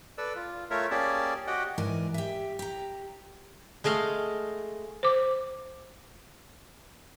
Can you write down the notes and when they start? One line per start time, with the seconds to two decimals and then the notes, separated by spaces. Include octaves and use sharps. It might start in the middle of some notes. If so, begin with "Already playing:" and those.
0.18 A4 B4 D5 E6
0.36 F4
0.70 A3 F4 A#4 C#5 E5
0.91 A#3 C#4 G4 G#4 D5 A5
1.47 F#4 G4 D#5 F#5 G5
1.78 G#2 E3 A#4 D5 G#5
2.14 G4 E5
2.59 G4 A#5
3.84 G#3 A3 D#5 F5
5.03 C5 D6